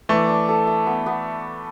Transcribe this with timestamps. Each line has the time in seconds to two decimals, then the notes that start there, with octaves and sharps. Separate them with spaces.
0.09 E3 A3 D4
0.29 D4
0.49 A4
0.67 E5
0.87 B3
1.06 B3